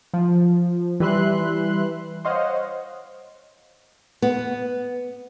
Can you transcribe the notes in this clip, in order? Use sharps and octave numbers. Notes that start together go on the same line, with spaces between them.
F3
E3 G3 B4 E5 C6 F#6
C5 C#5 D#5 F5 F#5
B3